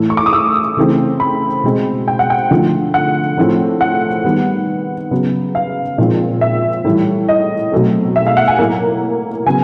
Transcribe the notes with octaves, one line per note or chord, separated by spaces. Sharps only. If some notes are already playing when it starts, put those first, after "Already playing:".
Already playing: A2 E3 A3
C#6
D6
D#6
E6
C#3 E3 A3 C4
B5
B2 G#3 C4
G5
F#5
G5
D3 F3 A3
F#5
A2 F3 A3 C4
F#5
D#3 G3 B3
C#3 F#3 B3
F5
A#2 F3 G#3 C4
E5
A2 E3 G3
D#5
B2 F#3 A3 C4
E5
F5
F#5
G#5
A2 F#3 A#3
C#3 F#3 B3 G#5